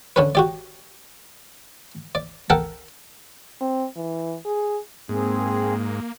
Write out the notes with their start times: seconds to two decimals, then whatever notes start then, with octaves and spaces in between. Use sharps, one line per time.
0.16 D3 C#4 B4
0.35 F#4 G4 D5
2.15 D5
2.50 A4 A#4 F#5 G5 A5
3.61 C4
3.97 E3
4.45 G#4
5.09 G#2 A#3 C4 G#4